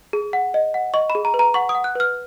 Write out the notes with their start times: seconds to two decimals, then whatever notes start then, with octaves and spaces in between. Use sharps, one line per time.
0.13 G#4
0.33 F#5
0.54 D#5
0.74 F#5
0.94 D#5 C#6
1.10 B5
1.15 G#4
1.25 A#5
1.34 B4
1.39 A#5
1.54 F#5 C#6
1.69 D#6
1.75 F#5
1.84 F#6
1.95 B4 F6